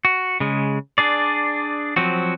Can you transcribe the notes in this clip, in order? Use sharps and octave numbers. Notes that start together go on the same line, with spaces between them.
F#4
C#3 G#3
D4 G#4 D5
F3 F#3 C4 F#4